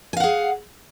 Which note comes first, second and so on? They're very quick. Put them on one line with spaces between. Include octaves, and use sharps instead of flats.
G#5 F5 F#5 G#4